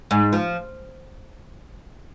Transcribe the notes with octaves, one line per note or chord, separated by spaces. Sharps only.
G#2
F3